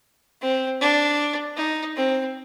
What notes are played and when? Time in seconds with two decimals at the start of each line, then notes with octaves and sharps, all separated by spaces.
0.41 C4
0.81 D4
1.56 D#4
1.96 C4